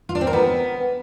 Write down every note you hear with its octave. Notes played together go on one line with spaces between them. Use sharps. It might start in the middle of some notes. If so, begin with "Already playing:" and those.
F4
D4
C4
A#4
B3